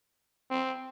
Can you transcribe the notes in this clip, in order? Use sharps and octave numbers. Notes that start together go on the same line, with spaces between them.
C4